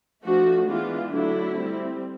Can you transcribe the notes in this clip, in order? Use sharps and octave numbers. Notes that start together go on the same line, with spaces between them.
F3 A3 D4 F#4
E3 G#3 B3 D4 F4
D3 F#3 A3 D4 E4
G3 C4